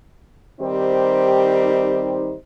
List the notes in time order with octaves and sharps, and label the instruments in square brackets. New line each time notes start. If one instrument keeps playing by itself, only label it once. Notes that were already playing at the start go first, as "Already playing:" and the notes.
[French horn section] D#3 G3 C4 D#4 G4 C5